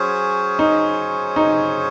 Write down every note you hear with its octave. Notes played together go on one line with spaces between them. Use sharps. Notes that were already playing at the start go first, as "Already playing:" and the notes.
Already playing: F#3 C#4 G#4 C5
D#4
D#4